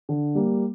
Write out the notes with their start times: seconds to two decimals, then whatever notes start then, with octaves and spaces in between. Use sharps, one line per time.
0.09 D3
0.35 G3 A#3